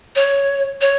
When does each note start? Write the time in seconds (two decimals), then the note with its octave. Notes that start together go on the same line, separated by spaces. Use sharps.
0.16 C#5
0.81 C#5